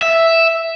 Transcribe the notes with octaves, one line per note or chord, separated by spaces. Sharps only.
E5